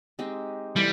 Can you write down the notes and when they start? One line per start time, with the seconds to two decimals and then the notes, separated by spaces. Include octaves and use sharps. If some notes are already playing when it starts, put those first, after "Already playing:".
0.19 G#3 C4 D#4 G4
0.76 C3 E3 G3 A3 C4